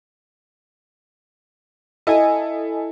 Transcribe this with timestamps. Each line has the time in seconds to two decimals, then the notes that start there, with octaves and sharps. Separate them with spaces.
2.07 E4 A4 D#5 G#5